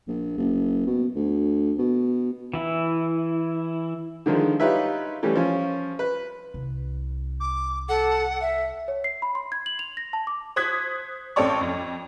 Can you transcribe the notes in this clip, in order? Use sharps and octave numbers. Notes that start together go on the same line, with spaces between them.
A#1
F#1
B2
D2
B2
E3 E4
D3 D#3 F3 G#3
D#4 F4 G4 B4 C#5 E5
E3 G3 A3 C#4 G4
F3 C#4
B4
C2
D6
A4 F#5
E5
C#5
C7
B5
C6
G#6
F#7
F7
A#6
A5
D6
C5 D#6 F#6 G#6 B6
A1 C4 A4 C#5 D5 C#6
F2